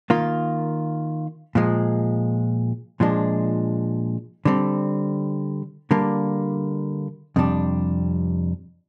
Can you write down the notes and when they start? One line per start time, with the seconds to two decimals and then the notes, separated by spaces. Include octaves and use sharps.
0.10 D#3 A#3 F4
1.55 A#2 F3 G#3
3.00 A#2 F3 G#3 D4
4.45 D3 G3 C4
5.91 D3 G3 A#3
7.36 F2 C3 G3 D4